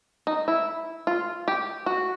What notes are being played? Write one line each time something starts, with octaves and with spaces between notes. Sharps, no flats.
D#4
E4
F4
G4
F#4